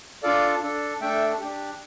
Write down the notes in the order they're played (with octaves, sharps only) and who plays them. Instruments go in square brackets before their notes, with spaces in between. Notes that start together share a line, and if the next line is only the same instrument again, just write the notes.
[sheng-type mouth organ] D4 F4 A4 D5 F5
D4 A4
A3 D4 A4 E5 G5
D4 G4